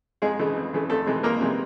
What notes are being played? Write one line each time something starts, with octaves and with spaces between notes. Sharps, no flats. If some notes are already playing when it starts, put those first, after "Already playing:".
F2 G#3 G#4
C#3 E3 A3
F2
C#3 E3 A3
F2 A3 A4
C3 E3 G#3
F2 A#3 A#4
C3 E3 G#3